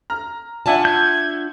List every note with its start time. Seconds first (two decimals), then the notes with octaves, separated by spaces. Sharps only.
0.10 A#5 F6
0.66 D4 F4 D5 E5 F#5 G#5 A5
0.85 G6 G#6